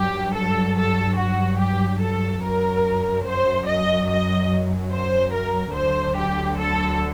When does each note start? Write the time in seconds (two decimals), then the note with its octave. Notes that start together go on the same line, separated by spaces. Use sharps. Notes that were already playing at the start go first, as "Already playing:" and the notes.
Already playing: G2 F#3 G4
0.35 A4
0.77 A4
1.18 F#4
1.60 G4
2.01 A4
2.43 F#2 F#3 A#4
3.26 C5
3.67 D#5
4.09 D#5
4.92 C5
5.33 A#4
5.75 D2 D3 F#3 C5
6.17 G4
6.59 A4